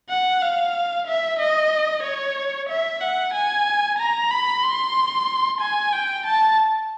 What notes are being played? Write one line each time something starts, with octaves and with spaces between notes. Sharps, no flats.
F#5
F5
E5
D#5
C#5
E5
F#5
G#5
A#5
B5
C6
G#5
G5
A5